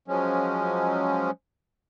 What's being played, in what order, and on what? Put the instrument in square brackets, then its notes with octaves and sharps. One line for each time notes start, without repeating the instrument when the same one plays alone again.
[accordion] F3 F#3 G#3 C#4